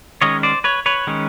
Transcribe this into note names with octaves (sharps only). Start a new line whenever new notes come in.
D#3 G#3 C#4 C#5 D#5
C5 D5
B4 C#5
B4 C#5
D#3 G#3 C#4